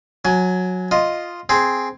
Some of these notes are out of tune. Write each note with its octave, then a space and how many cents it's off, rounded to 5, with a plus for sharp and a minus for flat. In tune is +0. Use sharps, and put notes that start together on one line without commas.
F#3 -15 G#5 +15
F4 +0 D#5 +0
C4 +0 G#4 +0